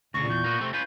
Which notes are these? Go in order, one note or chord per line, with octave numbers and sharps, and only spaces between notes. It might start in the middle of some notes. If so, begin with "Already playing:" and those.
D2 A#2 C#3 C#6 A#6
E2 G6
A#3 B3 F#4
C3 A3 C4
C#4 F4 B4 G6